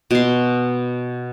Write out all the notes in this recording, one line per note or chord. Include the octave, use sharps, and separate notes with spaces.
B2 C6